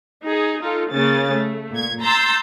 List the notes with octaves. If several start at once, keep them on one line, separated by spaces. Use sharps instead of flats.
D#4 G#4
D#4 F4 A4
C#3 A#3 A6
A3
A#2 G#6
A#5 C6 E6 G6 A6